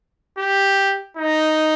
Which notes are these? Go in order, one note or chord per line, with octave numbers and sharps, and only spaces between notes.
G4
D#4